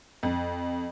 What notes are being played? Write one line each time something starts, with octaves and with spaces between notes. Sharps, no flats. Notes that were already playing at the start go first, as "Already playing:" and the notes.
F2